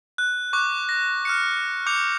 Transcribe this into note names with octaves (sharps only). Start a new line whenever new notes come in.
F#6
C#6 D6 F#6
A#6
F6 F#6 C#7
D6 G6 C#7 F7